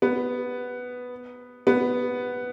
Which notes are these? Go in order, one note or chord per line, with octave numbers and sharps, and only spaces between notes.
B3
B3